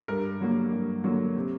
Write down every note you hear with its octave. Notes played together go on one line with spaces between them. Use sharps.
G2 A#4
D3 F#3 A#3
G2
D3 F#3 A#3
C3